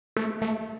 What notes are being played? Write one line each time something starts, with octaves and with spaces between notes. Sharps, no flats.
A3
A3